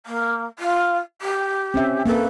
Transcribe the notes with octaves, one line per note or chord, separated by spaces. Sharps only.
A#3
F4
G4
C4 C#4 E5
A#3 A4 B4